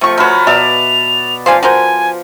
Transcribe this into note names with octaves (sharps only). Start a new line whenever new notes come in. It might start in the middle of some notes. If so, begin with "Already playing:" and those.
C3 F3 A3 C#6
A3 F#4 A#4 B4 C#5
B2 D5 E5 A5 F7
F3 C5 D5 F5 G#5
F#4 A#4 C5 G#5